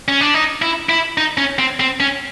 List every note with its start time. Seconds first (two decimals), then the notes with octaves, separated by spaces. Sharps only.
0.08 C#4
0.21 D4
0.34 D#4
0.62 E4
0.89 E4
1.18 D#4
1.38 C#4
1.59 C4
1.80 C4
2.00 C#4